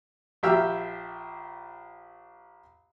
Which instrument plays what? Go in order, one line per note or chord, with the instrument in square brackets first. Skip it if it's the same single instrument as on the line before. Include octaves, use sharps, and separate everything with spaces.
[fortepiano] A#1 G4 E5 G5 E6 F6